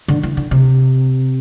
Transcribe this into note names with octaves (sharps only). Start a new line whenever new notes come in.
D3
E3
D3
C3